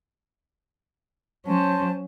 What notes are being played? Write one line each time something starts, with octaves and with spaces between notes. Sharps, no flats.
F#3 C#4 C5 A5